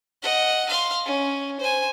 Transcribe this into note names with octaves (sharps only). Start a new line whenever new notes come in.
D#5 F#5
F5 C6
C#4
C5 G#5